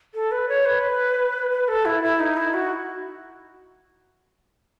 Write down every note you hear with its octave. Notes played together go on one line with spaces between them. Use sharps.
A4
B4
C#5
B4
B4
A4
E4
E4
D#4
E4
F#4